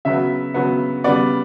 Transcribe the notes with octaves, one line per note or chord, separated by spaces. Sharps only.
C#3 F#3 B3 E5
C#3 F#3 B3
C#3 G3 B3 D5